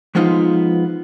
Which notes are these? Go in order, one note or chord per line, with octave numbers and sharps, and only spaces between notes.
F3 G#3 B3 D#4 F4